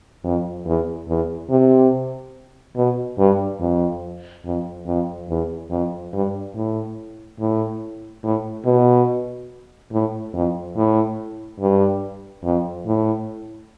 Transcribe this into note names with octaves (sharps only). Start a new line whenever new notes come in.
F2
E2
E2
C3
B2
G2
F2
F2
F2
E2
F2
G2
A2
A2
A2
B2
A2
F2
A2
G2
F2
A2